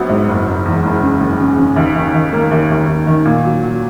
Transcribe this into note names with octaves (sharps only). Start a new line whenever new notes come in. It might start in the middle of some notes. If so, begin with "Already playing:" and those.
Already playing: A#1 F#3 B3
G#2
F#1
F#1
E2
F#1
C#3
F#1
C#3
C#3
D#2
D#3
D#3
A#3
D#2
D#2
D#2
D#3
A#2
F#3
F#3